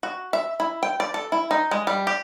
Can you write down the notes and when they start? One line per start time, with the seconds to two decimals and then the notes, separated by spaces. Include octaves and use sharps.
0.03 F#4
0.33 E5
0.60 E4
0.83 G5
1.00 D5
1.14 A4
1.32 E4
1.51 D#4
1.71 G#3
1.87 G3
2.07 G4